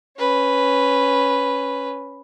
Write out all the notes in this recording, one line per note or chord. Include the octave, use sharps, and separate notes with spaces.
C#4 B4